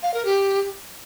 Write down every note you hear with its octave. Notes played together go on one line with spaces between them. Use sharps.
F5
A#4
G4